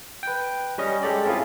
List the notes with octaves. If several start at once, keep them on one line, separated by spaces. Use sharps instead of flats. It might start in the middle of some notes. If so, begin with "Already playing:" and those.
B4 G5
G3 C#4 D#5
G#3 G4 A4 D5
C4 C#4 E4 F4 G#4